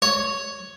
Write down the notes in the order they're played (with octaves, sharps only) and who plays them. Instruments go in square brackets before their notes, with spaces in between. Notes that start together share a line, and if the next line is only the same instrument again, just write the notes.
[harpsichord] C#5